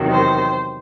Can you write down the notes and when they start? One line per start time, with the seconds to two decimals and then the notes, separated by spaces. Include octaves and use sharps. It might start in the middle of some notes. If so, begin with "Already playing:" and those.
Already playing: E2 C3 D#3 F#3
0.11 C5